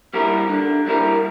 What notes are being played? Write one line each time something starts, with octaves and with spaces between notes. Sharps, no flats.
G3 A#3 E4 A#4
D3
G3 A#3 E4 A#4